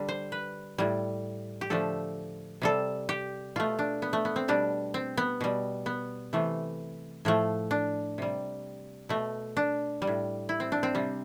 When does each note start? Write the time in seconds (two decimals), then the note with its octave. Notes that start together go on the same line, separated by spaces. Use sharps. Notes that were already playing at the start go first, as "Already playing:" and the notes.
Already playing: D3 G3
0.09 C5
0.32 B4
0.78 A2 G3
1.61 G4
1.70 D3 F3 A3 A4
2.62 C3 G3 A4
3.09 G4
3.56 B2 A3 F4
3.79 D4
4.02 B3
4.13 A3
4.25 B3
4.36 C4
4.48 B2 G3 D4
4.94 C4
5.17 B3
5.41 B2 G3
5.86 B3
6.33 C3 E3 A3
7.25 A2 F3 A3
7.71 D4
8.18 C3 G3
9.09 B2 A3
9.57 D4
10.02 G3
10.07 A2
10.49 E4
10.60 C4
10.72 D4
10.83 C4
10.95 C3 G3